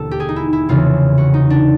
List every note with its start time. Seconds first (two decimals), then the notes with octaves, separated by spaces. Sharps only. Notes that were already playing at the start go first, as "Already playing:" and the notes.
Already playing: E1 D#2 D3 A4
0.11 G4
0.20 G#4
0.29 D#4
0.36 E4
0.53 E4
0.69 F1 E2 C#3 E3 F4
1.18 F#4
1.34 D#4
1.50 D4